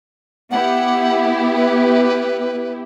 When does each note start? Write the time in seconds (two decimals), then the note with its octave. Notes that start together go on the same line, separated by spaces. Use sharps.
0.51 B3 E4 G4 F#5
1.56 B4